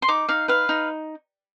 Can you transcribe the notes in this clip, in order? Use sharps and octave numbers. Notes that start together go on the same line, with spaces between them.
C6
D#4 D6
D#4 F5
B4 F5
D#4